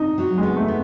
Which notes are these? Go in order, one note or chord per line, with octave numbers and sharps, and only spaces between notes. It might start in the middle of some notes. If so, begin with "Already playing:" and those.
Already playing: D#4
F#3
G#3
B3
A3
B3